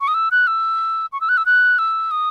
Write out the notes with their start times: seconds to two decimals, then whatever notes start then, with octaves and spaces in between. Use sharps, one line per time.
0.01 C#6
0.08 D#6
0.14 E6
0.31 F#6
0.47 E6
1.12 C#6
1.21 E6
1.29 F#6
1.37 E6
1.46 F#6
1.79 E6
2.11 D#6